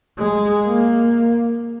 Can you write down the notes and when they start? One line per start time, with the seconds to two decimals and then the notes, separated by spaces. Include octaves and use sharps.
0.17 G#3
0.66 A#3